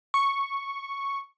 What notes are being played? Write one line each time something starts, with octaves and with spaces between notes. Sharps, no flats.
C#6